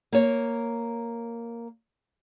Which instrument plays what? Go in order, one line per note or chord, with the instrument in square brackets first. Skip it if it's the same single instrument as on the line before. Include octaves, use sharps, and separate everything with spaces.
[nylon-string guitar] A#3 C#5